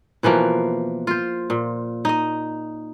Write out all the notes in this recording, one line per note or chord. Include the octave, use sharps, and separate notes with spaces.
B2 E3 F3 A#3
F4 C5
A#2
D#4 D#5